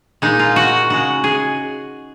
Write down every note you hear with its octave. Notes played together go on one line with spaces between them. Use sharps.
A#2 G#3 D#4
F4
F#4
C#3 G#3 F#4
G#4